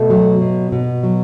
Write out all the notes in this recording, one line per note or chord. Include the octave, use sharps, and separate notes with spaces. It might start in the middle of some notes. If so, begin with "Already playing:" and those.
Already playing: B2 A3 A4
F#3
B2
B2
F#3